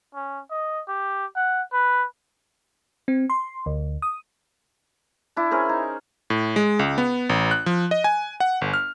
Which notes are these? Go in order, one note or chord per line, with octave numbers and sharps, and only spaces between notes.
C#4
D#5
G4
F#5
B4
C4
C6
D2
D#6
D4 E4
C#4 G#4 A#4 C5
D#4
A2
G#3
C#2
B3
A1
F#6
F3
D#5
G#5
F#5
G1
F6